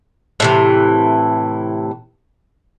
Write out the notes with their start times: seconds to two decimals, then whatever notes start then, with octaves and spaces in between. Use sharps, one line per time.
0.40 A2 C3 E3